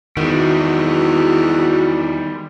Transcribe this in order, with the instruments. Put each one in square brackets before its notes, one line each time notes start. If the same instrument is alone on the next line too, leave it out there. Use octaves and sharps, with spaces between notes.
[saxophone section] E2 [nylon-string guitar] D#3 [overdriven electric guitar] G3 G#3 [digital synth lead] F#4